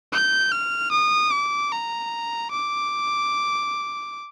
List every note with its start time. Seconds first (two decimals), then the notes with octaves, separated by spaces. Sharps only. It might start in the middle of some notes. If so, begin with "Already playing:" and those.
0.13 G6
0.52 F6
0.92 D#6
1.32 D6
1.72 A#5
2.51 D6